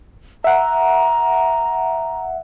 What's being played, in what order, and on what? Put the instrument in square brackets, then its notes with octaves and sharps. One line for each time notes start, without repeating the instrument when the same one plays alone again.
[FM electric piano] E5 F#5 [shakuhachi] A#5